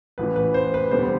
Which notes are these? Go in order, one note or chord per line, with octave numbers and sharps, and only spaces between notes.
A1 A2 E3 B4
B4
C5
B4
E1 D2 D3 G3 B3 C5